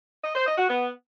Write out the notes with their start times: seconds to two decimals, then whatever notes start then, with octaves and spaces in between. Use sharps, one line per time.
0.24 D#5
0.36 C5
0.47 D#5
0.58 F#4
0.69 B3